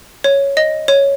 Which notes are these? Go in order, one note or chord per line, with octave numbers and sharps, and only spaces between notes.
C#5
D#5
C#5